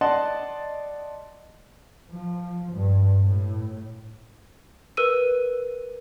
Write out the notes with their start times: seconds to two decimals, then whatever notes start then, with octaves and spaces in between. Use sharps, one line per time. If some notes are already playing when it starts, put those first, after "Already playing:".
0.01 D5 D#5 F#5 A5 C6
2.09 F3
2.72 G2
3.23 A2
4.97 A#4 B4 E6 D#7